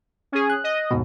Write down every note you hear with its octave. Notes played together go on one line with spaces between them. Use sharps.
C#4 G#4
F#6
D#5
D#2 G#2 B2